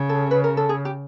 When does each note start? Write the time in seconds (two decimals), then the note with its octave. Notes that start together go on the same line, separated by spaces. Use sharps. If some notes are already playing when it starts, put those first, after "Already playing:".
Already playing: C#3
0.09 A4
0.31 B4
0.44 A#4
0.57 A4
0.69 G#4
0.85 G4